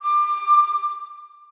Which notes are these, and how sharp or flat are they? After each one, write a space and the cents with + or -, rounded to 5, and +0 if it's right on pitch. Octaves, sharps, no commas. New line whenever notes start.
D6 +25